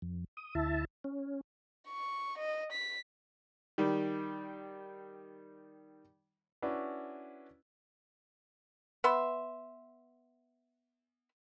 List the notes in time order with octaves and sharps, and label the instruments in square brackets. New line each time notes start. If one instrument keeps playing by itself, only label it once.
[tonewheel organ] F2
D#6
D2 E4 E5 A5
C#4
[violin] C#6
D#5
B6
[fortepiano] D#3 G3
[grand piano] C#4 D4 E4 F#4 B4
[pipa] B3 E5 C6